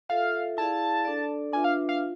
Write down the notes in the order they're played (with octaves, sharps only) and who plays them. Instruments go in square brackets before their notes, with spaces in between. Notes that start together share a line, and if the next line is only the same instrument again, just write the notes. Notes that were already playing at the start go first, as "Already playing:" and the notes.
[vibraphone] F4 A4 E5 [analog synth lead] F5
[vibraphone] E4 G#4 D5 F5 [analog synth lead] A5
[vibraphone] D4 A4 D5
[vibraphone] D4 F4 B4 E5 [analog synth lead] G#5
[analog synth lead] F5
F5
[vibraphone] F4